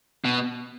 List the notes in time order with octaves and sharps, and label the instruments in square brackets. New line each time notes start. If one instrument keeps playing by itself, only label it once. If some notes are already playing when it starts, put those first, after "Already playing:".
[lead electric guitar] B2